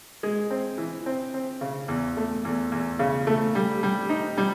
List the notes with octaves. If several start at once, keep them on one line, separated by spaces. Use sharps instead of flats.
G#3
C4
E3
C4
C4
C#3
E2
A3
E2
E2
C#3
A3
G3
G3
D#4
G3